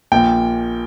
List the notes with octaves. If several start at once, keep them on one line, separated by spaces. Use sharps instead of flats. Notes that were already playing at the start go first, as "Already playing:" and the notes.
A#1 A#2 G5